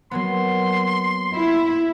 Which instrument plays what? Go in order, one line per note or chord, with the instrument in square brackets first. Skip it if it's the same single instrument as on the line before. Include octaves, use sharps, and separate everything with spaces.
[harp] F#3 A#3 B3 [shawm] C6
[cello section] E4